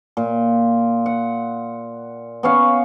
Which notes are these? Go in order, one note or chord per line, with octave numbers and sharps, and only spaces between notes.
A#2
F#5
B3 C#4 C#5 F5